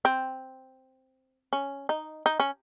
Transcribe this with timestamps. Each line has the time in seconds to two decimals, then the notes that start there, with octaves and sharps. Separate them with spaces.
0.05 C4
1.53 C#4
1.89 D#4
2.26 D#4
2.40 C#4